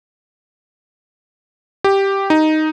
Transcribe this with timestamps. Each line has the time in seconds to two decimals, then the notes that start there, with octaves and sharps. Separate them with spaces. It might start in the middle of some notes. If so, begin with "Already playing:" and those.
1.84 G4
2.30 D#4